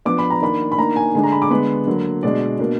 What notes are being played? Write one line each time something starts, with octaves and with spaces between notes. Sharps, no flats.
F3 B3 D4 D6
B5
A#5
D#3 A#3 D4 B5
B5
D#3 A#3 D4 A#5
G#5
D3 G#3 D4 G#5
A#5
B5
D6
D3 G#3 B3 D4 B5
D3 F#3 A#3
B2 G#3 D4 D5
B2 A#3 D4